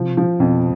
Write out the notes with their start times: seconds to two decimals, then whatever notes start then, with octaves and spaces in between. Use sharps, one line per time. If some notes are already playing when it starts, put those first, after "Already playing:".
Already playing: C3 F3
0.17 F3
0.39 F2 B2